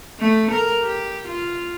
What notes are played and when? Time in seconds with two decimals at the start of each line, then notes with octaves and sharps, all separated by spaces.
0.20 A3
0.51 A#4
0.83 G4
1.27 F4